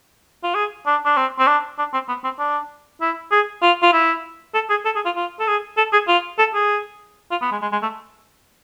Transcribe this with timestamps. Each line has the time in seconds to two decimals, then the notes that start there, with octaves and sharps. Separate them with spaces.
0.43 F4
0.55 G#4
0.86 D4
1.05 D4
1.17 C4
1.39 C4
1.47 D4
1.78 D4
1.93 C4
2.08 B3
2.24 C4
2.39 D4
3.01 E4
3.31 G#4
3.62 F4
3.82 F4
3.93 E4
4.54 A4
4.70 G#4
4.85 A4
4.95 G#4
5.05 F4
5.16 F4
5.40 A4
5.47 G#4
5.77 A4
5.93 G#4
6.08 F4
6.39 A4
6.54 G#4
7.31 F4
7.42 B3
7.52 G#3
7.62 G#3
7.72 G#3
7.82 A3